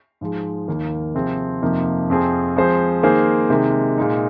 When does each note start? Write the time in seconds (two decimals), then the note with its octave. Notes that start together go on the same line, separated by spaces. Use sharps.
0.21 G#2 F3 G#3
0.68 D#2 D#3 A#3
1.15 C3 F3 C4 G#4
1.62 F2 C3 F3 A#3 D#4
2.10 F2 F3 C4 G#4
2.56 F3 G#3 C4 G#4 C5
3.03 D#3 A#3 G#4 C5
3.50 C3 D#3 G#3
3.97 A#2 G#3 D#4